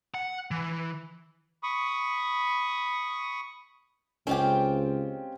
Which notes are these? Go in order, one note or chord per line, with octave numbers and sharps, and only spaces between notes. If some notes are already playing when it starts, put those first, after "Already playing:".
F#5
E3
B5 C#6 D#6
C#2 C4 C#4 F4 G4 D#5 G5